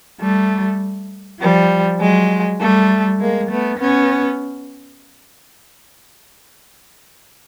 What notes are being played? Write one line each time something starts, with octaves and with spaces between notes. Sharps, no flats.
G3 A3
F3 G3
F#3 G#3
G3 A3
G#3 A#3
A3 B3
B3 C#4